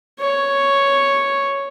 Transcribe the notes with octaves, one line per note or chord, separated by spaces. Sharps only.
C#5